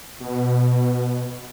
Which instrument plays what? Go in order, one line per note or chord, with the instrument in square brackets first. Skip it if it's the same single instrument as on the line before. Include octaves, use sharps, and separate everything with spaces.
[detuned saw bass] B2